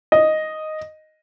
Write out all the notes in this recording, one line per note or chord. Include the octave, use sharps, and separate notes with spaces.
D#5